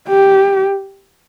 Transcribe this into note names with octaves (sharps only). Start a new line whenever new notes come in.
G4